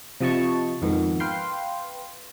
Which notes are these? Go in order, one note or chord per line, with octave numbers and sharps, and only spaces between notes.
C3 F3 D#5 A5 C#6
F2 G#2 D#3 B3
B4 F5 G5 C6